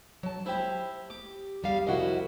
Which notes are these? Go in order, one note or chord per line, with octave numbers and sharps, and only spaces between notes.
F#3 A5
E4 G4 C5
G4 D6
E2 G3 F5
C2 F2 E4 F#4 D#5